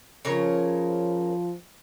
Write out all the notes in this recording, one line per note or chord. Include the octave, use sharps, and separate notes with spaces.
C#3 F3 A#4 C#5